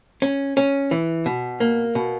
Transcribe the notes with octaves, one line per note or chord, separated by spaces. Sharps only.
C#4
C#4
E3
B2
A#3
B2